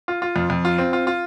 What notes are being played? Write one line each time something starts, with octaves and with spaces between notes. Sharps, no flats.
F4
F4
F2
F2
F4
C4
F4
F4